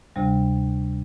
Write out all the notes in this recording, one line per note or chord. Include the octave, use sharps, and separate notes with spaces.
D2 C3 G3